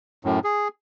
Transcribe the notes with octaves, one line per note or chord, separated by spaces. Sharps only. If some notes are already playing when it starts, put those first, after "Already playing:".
F#2 A2
G#4